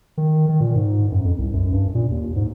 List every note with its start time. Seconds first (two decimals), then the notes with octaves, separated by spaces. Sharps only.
0.17 D#3
0.49 D#3
0.61 A#2
0.76 G#2
1.12 F#2
1.25 F2
1.39 C2
1.54 F#2
1.72 G2
1.95 A#2
2.11 D#2
2.36 G#2